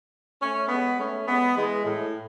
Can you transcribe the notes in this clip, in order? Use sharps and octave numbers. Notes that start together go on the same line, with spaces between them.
A3 C#4
G#3 B3
A3 C#4
G#3 B3
E3 G#3
A2